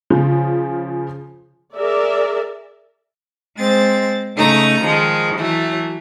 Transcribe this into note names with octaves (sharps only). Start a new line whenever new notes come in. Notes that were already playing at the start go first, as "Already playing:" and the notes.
C#3 F3
G#4 A#4 D5 E5
G#3 C4 A6
C#3 A3 D#4 A#5
D#3 F3 G#3
E3 F#3 A3